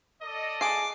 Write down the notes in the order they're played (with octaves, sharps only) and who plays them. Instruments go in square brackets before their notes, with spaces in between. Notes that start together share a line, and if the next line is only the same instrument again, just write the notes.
[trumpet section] A4 D5 D#5
[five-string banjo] G#4 F#5 [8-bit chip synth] D6 C7